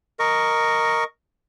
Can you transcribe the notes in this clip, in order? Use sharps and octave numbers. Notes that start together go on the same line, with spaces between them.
A#4 D#5 C#6